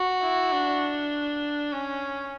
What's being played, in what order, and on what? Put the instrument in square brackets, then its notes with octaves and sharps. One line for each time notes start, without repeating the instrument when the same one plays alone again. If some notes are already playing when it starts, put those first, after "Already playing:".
Already playing: [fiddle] F#4
[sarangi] E4
D4
C#4